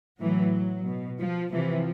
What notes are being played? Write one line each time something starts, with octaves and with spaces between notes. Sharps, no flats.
A2 E3 F#3
B2
F3
C3 E3 F3